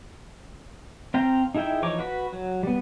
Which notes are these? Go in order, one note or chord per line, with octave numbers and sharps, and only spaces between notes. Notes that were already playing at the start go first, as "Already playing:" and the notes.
C4 F5 G5 A#5
D#4 E4 G#4 E5 G5
E3 F3 D#4 C#5 D6
F#4 B4 B5
F#3
G3 B3